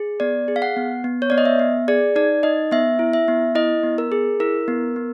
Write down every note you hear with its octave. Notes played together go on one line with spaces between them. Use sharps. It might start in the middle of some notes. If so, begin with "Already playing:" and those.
Already playing: G#4
B3 D5
G#4
F5
F#5
B3
B3
C#5
B3 D5
D#5
E5
B3
G#4 D5
D#4 D5
D#4 D#5
B3 E5
E4
E5
B3
E4 D#5
B3
A#4
G#4
E4 A#4
B3
B3